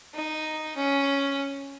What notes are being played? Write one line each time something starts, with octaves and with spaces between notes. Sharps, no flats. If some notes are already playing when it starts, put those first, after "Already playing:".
D#4
C#4